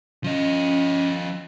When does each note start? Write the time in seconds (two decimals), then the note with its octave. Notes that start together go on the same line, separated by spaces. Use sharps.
0.24 F3 C#4 D#5